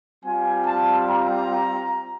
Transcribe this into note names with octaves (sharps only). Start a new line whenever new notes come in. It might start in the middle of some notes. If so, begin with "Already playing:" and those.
G3 C4 F4 G#5
A5
A#5